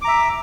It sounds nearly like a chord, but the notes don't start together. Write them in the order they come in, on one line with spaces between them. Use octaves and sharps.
D6 A#5 E5